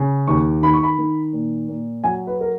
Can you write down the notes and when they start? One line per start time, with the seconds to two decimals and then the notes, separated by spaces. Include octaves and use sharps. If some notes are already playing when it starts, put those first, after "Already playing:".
Already playing: C#3
0.28 D#2 C#6
0.62 D#3 B5
0.74 C#6
0.83 B5
0.99 D#3
1.33 A#2
1.69 A#2
2.04 F#3 G#5
2.27 B4
2.41 A#4